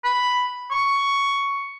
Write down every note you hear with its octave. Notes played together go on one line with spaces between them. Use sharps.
B5
C#6